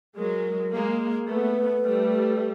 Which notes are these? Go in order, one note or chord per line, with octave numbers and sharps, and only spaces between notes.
F#3 G#3 A#4
G#3 A#3
A3 B3 B4
G3 A3